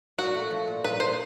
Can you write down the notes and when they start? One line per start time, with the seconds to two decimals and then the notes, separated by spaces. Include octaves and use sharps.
0.18 A#2 F#4
0.34 A3
0.51 F3
0.67 A#2
0.84 A#2 B4
1.00 A#2 C5